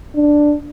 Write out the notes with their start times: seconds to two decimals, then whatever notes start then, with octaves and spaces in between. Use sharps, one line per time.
0.15 D4